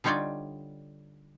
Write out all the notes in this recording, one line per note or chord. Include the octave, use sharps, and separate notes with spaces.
D3 G3 D#4 F4 C#5 D5